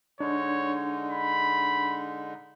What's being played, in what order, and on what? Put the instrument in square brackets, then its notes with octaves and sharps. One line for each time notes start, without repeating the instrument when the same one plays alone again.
[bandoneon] D3 G#3 D#4 [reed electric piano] D4 [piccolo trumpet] C#5
[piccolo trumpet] B5